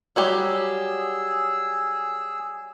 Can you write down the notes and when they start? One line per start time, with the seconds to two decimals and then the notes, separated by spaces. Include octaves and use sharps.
0.16 F#3 G3 G4 G#4 E6